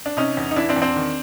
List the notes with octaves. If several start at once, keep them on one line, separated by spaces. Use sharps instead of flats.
D4
C3 C#4 D#4
E2
D#4
E3 D4 E4
C4 D4
E2
C4 D4
D#3